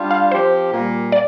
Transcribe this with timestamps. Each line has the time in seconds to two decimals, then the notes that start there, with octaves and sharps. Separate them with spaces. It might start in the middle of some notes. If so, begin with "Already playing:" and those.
Already playing: G3 D4 F4
0.11 F5
0.31 F3 C4 G4 C5
0.72 A#2 G3 A#3
1.12 D5